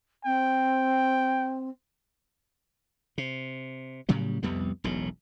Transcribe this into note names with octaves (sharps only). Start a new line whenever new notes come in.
C4 G5
C3
A2 C#3 F#3 G3
C2 F2 G3 B3
E1 B1 A2